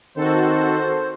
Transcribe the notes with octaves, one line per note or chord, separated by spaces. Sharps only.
D#3 C4 F#4 A4 C5